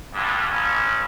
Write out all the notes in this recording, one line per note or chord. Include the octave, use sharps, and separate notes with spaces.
C2 G2
A1 C#4